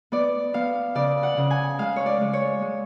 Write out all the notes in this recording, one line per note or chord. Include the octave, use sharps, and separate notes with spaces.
B3 D5
B3 F5
C#3 D5
F#5
C#3
G#5
G#3 F5
C#5
D5
G#3
C#5
G#3